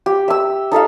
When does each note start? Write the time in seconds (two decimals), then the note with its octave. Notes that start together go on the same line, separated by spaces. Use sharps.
0.06 G4
0.28 E5 E6
0.72 D#4 A4 E5 F5